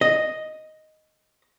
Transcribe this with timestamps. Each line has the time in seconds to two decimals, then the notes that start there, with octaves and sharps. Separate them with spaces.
0.01 D#5